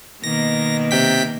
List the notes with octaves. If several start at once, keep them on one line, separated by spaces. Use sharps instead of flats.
B2 D#3 A#3 A#6
C3 G5 B6